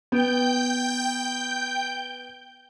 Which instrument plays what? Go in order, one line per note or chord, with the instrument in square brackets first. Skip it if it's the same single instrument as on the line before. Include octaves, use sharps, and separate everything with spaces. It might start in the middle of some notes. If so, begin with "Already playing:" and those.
[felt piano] B3 [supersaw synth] G5 G6